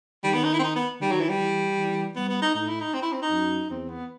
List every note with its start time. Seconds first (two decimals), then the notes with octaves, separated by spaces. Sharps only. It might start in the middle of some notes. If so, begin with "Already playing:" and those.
0.24 D#3 G3
0.34 B3
0.44 D#4
0.53 E4
0.59 C4
0.63 D#4
0.76 B3
1.00 D#3 G3
1.11 F#3
1.20 E3
1.29 G3
1.40 E3
1.78 E3
2.16 G3 B3
2.29 B3
2.42 D#4
2.54 A2 D#4
2.68 E4
2.81 D#4
2.94 C4
3.02 E4
3.12 C4
3.22 D#4
3.31 F#2
3.70 E2 C4
3.89 B3